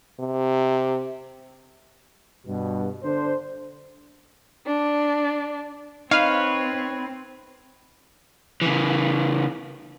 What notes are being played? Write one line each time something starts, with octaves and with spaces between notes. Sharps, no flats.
C3
G2 B2
D3 D4 C5
D4
C4 D#4 B4 C#5 F5
C#3 E3